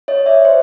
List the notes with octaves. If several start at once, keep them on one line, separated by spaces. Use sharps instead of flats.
C#5 D#5
D5 E5
C5